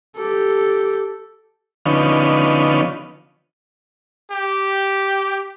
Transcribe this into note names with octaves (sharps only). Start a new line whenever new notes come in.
G4 A4
D3 F3 B3 C#4 D#4
G4